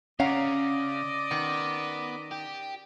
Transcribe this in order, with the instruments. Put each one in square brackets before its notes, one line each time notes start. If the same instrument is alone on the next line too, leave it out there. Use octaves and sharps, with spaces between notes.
[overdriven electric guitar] C#3 [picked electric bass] C#4 [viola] D5 D#5 [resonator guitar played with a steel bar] F5 F#5 A#5
[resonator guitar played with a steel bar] D#3 [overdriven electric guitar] B3
[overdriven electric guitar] G4